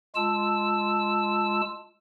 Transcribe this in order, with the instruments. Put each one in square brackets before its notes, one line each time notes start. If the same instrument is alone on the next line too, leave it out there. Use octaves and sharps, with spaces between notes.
[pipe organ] G#3 F4 A5 E6